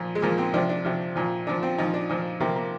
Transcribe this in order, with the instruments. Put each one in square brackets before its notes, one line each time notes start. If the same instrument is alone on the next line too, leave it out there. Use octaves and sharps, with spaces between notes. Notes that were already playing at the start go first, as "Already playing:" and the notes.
Already playing: [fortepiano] A#2 F3
G#3
A#2 F3 A#3
C4
C3 F3 D4
D4
C3 F3
A#2 F3
A#2 F3 D4
C4
A#2 F3 D#4
D4
A#2 F3
C3 F3 A#3
A#3